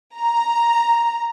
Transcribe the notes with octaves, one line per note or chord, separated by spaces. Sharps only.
A#5